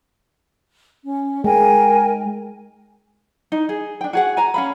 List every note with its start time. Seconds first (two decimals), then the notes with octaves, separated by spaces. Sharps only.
1.05 C#4
1.44 G#3 A#4 G5 G#5
3.52 D#4
3.69 G#4
4.01 D4 G5
4.13 F#4 G#4 F#5
4.37 G#5 A#5
4.54 C#4 F5 B5